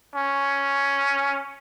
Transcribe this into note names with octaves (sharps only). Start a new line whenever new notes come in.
C#4